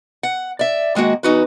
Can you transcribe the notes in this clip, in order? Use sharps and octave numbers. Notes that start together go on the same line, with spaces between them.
F#5
D5 E5
D#3 G#3 A#3 F#4 F#5
E2 D#4 F#4 B4